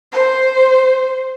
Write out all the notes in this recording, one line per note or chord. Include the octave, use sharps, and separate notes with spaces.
C5